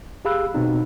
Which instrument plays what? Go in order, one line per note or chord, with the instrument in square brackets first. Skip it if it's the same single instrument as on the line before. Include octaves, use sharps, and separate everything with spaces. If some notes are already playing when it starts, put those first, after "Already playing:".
[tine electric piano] G4 G#4 F5 B5 E6 F#6
B2 C4 D#4